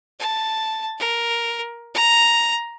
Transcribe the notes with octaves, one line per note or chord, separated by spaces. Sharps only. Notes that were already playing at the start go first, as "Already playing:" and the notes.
A5
A#4
A#5